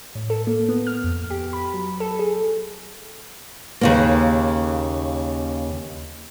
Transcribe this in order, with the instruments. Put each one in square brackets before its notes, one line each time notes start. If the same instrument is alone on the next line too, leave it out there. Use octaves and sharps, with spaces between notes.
[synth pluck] A2
A4
A#3
B3
F6
F2
G4
B5
F#3
A4
G#4
[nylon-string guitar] D#2 C#3 A#3